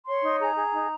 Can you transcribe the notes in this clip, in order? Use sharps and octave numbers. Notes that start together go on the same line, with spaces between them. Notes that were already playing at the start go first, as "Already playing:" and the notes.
C#5 C6
D#4
G#4 A#5
G#4
D#4